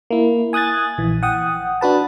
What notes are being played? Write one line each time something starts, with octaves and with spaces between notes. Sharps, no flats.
A#3 E4
G#5 D#6 F#6 G#6 A6
A#1 E3
F#5 G5 D#6
D4 F#4 B4 A5